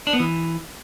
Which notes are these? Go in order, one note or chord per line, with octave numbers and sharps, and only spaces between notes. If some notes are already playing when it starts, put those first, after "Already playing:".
D4
B3
E3